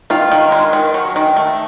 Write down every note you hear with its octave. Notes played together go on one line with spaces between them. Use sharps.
D#3 F4
D#3
G#3
D#3
F#3
D#3
A3